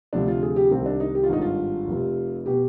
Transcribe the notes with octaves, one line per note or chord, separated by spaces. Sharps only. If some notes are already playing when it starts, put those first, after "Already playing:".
D2 C3 F3 D4
F4
G#4
G4
C2 C3 D#3 C4
D4
D#4
G4
F4
G#1 G2 D#3 D#4
F4
F1 F2 C3
B2 G4